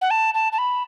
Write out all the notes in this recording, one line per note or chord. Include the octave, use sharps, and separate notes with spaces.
F#5
A5
A5
A5
B5